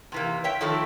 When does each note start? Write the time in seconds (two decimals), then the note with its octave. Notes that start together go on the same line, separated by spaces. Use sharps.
0.12 C3 E3 A#3
0.44 C#5 E5 G5
0.60 D#3 F3 A3 C4 E4 A4